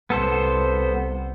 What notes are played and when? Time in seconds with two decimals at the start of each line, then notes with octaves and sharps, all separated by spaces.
0.10 C2 B3 A4 C5